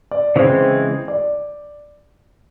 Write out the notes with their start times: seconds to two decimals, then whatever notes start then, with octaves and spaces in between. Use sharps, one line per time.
0.11 D5
0.35 C#3 E3 G#3 C4 C5
1.08 D5